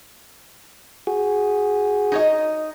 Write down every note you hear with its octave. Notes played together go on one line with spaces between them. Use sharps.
F#4 G#4
D#4 C#5 D#5